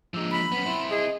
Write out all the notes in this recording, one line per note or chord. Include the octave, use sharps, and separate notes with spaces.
F3 G#3 A#3 D4 E6
B5
F#3 B3 C#4
C4 E4 C6
G#4 D#5